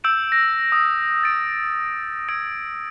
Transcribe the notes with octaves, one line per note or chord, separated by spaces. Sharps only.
E6 G6 D7 E7
A#6
D#6
A6 D7
E6 G#6 A#6 D7